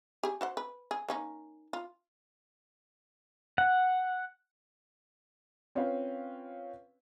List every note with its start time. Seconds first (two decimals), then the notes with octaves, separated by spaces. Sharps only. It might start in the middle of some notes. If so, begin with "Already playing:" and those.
0.23 G4 G#4
0.41 F#4 C5 F#5
0.57 B4
0.91 G#4
1.08 A#3 C#4 D#4
1.73 F4
3.58 F#5
5.75 C4 C#4 F4 B4 F5 G5